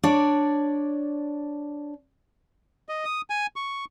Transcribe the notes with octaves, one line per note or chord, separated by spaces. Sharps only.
D4 C#5 D5
D#5
D#6
G#5
C#6